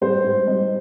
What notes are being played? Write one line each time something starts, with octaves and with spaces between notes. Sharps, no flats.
G3 C5
G#2
G3 D#5